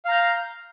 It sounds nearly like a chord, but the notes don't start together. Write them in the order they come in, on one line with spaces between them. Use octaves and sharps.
F5 A#5 G6